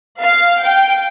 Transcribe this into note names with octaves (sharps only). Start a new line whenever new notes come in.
F5
G5